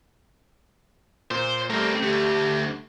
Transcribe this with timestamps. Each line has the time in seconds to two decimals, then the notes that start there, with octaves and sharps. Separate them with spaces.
1.31 A#2 C5
1.70 G3 A3 A#3 C4
2.03 D2 G4